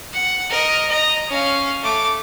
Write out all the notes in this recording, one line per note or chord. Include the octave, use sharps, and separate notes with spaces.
F#5
A#4 D#5
D#5 A#5
C#4 F5
A3 D6